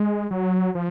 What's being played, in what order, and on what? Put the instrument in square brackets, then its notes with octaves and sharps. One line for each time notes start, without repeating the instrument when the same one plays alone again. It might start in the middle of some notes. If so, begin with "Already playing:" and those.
Already playing: [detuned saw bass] G#3
F#3
F3